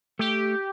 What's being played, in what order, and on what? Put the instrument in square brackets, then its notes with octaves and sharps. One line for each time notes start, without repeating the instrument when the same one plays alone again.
[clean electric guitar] A3 [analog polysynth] G4